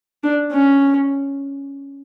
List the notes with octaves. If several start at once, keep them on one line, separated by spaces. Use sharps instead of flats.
D4
C#4